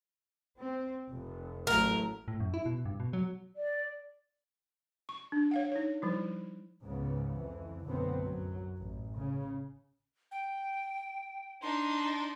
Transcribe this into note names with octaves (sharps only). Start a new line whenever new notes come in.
C4
F1
A1 F#3 A3 A#4
A2
F#2
E4
B2
G2
B2
F#3
D5
C#6
D4
C#5 F5 F#5
D#4 C#5
F3 G3 E4
C#2 G#2 C#3 B3
F2 E3
B1 F#2 A2 D3 B3 C4
F#2 F#3
A1
C#3
G5
D4 D#4 C6